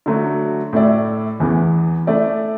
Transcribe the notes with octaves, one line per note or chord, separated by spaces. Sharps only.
D3 F#3 A3 F#4
A2 A3 E4 D5
E2 E3 B3
A3 E4 D5